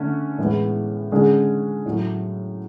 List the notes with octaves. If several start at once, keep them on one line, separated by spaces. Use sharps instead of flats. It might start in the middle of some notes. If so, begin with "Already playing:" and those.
Already playing: D3 A3 C#4
A2 E3 G#3 B3
D3 G#3 C#4 G#4
A2 F#3 A3